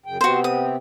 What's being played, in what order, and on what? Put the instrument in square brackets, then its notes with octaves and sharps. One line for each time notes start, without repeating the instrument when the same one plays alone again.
[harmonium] F#2 C#3 G5
[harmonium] C3 B3 C4 [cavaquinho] F#4 C5
[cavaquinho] D#6